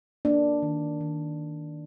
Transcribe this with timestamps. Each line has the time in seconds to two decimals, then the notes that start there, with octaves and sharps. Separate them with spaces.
0.25 A#3 D4
0.62 D#3
1.01 D#3